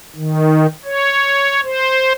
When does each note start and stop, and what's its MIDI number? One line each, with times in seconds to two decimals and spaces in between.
0.15 0.66 51
0.85 1.60 73
1.63 2.13 72